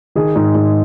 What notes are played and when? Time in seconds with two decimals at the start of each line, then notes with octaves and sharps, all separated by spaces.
0.15 D#3 G#4
0.35 G#2
0.55 G#2